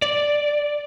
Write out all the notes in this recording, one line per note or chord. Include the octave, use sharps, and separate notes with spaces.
D5